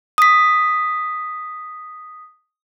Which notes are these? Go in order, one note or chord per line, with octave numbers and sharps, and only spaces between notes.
D#6 B6